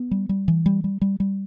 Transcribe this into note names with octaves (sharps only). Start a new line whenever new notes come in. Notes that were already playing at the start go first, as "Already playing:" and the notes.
Already playing: B3
G3
G3
E3
G3
G3
G3
G3